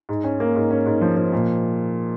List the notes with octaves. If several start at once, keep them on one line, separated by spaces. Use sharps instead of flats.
G#2
C#4
A#3
G#2
C#4
G#2
F3
F3
A#2